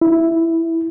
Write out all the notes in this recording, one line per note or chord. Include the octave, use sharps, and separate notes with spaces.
E4